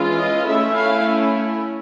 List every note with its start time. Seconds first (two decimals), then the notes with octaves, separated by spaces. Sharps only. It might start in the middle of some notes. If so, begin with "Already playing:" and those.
Already playing: E3 G#3 C#4 F4
0.19 D#5
0.48 A3 C#4 E4 E5
0.77 F5